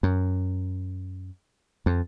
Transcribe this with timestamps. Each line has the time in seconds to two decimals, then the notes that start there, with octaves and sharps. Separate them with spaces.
0.03 F#2
1.86 F2